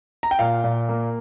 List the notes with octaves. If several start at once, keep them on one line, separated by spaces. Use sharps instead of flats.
A#5
G5
A#2 F5
A#2
A#3